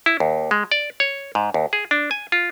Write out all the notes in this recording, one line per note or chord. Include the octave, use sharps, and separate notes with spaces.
E4
D#2
G#3
D5
C#5
G#2
D#2
G#4
D4
G#5
F4